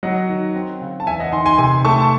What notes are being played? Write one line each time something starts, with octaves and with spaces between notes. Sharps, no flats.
F#3 D#5 F#5
D#3
C4
C#3
A5
E2 E5 G#5
D#5 F#5
D#3 G#5 C6
G#5 C6
C3 G#5 C6
A3 A5 C#6
A5